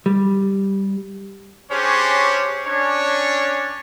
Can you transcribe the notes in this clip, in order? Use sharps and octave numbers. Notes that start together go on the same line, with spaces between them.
G3
C#4 D4 G4 G#4 C5 C#5
C#4 D4 C#5